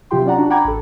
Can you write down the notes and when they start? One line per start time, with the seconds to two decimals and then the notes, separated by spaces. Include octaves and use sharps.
0.11 C3 F#3 F4 G4 G5 C6
0.25 C#4 F4 D5 F#5 A#5
0.38 D4 F#4
0.50 F#5 G5 A#5 B5 D6 G#6
0.65 A1 A4